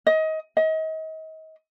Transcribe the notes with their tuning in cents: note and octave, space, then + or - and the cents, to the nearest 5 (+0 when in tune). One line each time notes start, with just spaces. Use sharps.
D#5 +25
D#5 +35